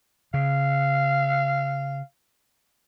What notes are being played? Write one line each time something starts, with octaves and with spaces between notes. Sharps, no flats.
C#3 F5